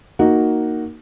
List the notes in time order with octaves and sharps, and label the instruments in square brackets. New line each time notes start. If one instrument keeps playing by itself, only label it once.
[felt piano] A#3 D#4 F#4